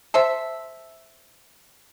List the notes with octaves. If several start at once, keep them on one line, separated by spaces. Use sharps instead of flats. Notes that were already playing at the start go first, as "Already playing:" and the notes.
A4 C5 E5